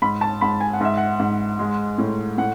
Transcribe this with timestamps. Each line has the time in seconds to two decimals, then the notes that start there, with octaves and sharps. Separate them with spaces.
0.02 G#2 B5
0.21 A5
0.41 G#2 B5
0.60 G#5
0.73 F#5
0.81 G#2 E5
0.97 F#5
1.20 G#2
1.59 G#3
1.98 A2
2.38 A2 F#5